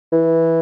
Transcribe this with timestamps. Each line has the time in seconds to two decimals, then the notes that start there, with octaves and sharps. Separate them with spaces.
0.12 E3